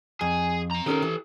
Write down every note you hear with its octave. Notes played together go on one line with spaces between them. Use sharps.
F2 G#4
C4 A#5
D#3 C#4 G4 A4 A#4
E3